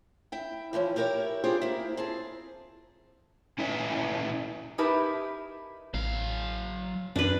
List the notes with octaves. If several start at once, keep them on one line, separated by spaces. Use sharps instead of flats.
E4 G5
E3 F3 A#3 C#4
E4 G4 A#4 B4 C#5
C4 D4 F4 G4 G#4 C5
A#3 E4
C4 G#4 A5
A#2 C#4 E4 B4 E5
D#4 E4 G4 A#4 B4 A5
A1 F#3 F5
F#2 D4 B4